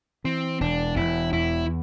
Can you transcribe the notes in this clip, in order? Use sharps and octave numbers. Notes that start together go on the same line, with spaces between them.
E3 C4
E1 D4
E1 E4
E2 E4